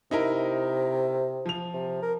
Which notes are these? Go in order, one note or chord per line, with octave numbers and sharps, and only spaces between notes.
C3 D#4 E4 A#4
F3 F7
C3
A#4